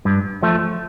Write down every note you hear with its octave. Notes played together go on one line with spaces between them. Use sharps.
G2
F3 A3